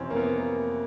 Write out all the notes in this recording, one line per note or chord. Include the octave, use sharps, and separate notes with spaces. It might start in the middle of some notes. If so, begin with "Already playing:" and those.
Already playing: F2 C3 E3 C4 C#4
A#3
B3
A#3